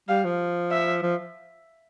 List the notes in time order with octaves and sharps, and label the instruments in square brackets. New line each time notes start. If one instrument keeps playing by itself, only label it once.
[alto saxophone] G3 [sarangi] F5
[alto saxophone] F3
[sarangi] E5
[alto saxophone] F3